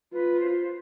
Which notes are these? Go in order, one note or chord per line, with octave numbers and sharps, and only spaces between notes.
F4 B4
C5